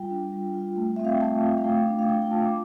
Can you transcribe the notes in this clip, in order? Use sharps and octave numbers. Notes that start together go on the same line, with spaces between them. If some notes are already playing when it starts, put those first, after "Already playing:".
Already playing: G3 F4 G5
D4
G3
F4
A3
C4 E5
F5
G5
A3 A5
F4
F5
A3 G5
D4
F5
A3 G5
G5
F4 A5
D6